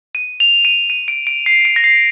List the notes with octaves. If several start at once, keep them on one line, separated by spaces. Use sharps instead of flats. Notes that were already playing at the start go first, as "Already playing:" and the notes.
D#7
F7
D#7
D#7
D7
D7
C7
D7
A#6
C7